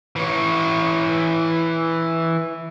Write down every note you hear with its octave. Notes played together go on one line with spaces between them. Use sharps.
E3 C#5